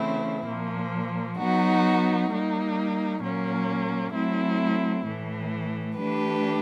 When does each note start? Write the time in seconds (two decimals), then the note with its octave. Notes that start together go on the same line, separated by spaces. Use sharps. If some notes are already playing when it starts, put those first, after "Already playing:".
Already playing: C#3 E3 A3 C4 E4
0.46 A#2 F3 A#3
1.38 F#3 B3 D#4 F#4
2.31 G3 A#3 D#4
3.22 A#2 F#3 A#3 C#4
4.14 F#3 A3 C4 E4
5.06 A2 E3 A3
5.98 E3 A3 D4 G4 B4